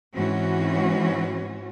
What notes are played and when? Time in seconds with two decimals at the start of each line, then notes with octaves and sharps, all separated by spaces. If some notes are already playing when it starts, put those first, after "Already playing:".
0.15 G#2 E3 C4 C#4 F#4